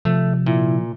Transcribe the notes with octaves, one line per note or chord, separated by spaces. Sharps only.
C3 F3 A3
A#2 E4